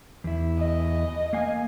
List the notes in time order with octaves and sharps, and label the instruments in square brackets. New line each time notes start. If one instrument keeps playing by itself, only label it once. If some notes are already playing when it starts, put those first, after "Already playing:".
[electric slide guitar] E2 E4
[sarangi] D#5
[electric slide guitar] A#3 F5 G#5